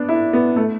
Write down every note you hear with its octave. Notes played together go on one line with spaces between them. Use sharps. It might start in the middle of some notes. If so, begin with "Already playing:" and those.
Already playing: B3 D4
E4
B3
A3